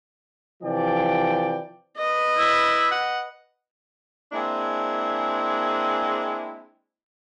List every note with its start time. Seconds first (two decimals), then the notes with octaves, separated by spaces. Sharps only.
0.63 C3 E3 F3 D5 G5
1.98 B4 D#5
2.38 E4
2.91 F#5
4.32 G#3 A#3 C4 D4 E4 G#4